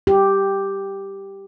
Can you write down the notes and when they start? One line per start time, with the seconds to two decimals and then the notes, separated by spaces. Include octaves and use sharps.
0.07 G4